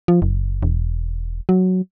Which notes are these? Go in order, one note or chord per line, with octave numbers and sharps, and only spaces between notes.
F3
F#1
E1
F#3